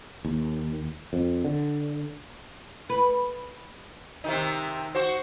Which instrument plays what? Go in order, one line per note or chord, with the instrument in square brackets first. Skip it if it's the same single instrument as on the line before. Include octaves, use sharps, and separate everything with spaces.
[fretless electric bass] D#2
F2
D3
[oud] B4
[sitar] C3 D#3 D#4
F#4 C5